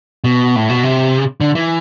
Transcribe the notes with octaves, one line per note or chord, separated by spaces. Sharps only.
B2
A2
B2
C3
D3
E3